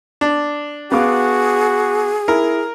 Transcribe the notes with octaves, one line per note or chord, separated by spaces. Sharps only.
D4
B3 F#4 G#4 F5 D6
E4 A#4